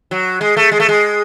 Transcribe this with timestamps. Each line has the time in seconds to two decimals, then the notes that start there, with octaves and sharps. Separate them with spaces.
0.11 F#3
0.41 G#3
0.57 A3
0.72 G#3
0.80 A3
0.89 G#3